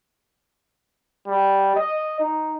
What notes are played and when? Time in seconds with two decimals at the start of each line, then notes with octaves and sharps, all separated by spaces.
1.27 G3
1.75 D#5
2.20 D#4